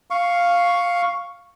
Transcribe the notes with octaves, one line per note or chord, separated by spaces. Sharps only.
F5 C#6